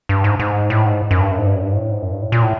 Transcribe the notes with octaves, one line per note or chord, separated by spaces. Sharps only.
G2
G#2
G#2
A2
G#2
F#2
G2
F#2
G#2
G2
F#2
G2
G#2
A2
G#2
F#2
G2
A2
A#2
A2